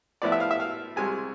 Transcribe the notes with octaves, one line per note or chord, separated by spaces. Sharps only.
A2 F3 B3 E4 D5
E5
F5
E5
F5
C2 C3 G#3 G#5